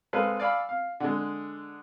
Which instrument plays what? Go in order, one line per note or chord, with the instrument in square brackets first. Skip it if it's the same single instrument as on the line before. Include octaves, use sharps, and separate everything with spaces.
[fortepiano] G#3 C4 A4 B4 F5
D5 F5 G#5 B5 E6
F5
D3 G#3